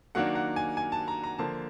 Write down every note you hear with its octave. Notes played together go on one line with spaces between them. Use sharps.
D#3 F#3 A#3 D4 F#5
F#5
G#5
G#5
A5
A#5
A#5
D3 F3 A#3 A5